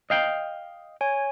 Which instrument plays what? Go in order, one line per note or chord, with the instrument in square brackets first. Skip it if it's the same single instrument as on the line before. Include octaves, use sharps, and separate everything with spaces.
[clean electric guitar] D#5 F5 G5
[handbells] C#5 G#5